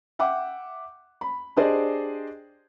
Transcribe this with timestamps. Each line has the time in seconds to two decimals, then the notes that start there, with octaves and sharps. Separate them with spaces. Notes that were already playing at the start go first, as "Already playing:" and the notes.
0.19 E5 F#5 G5 D6
1.21 B5
1.56 D4 G4 G#4 C5 D5 D#5